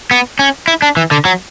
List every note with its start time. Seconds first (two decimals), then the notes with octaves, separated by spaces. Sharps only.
0.11 B3
0.39 C#4
0.68 E4
0.82 D4
0.97 E3
1.11 D3
1.25 F#3